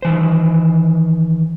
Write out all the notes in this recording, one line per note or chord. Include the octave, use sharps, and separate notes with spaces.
D#3 E3 C5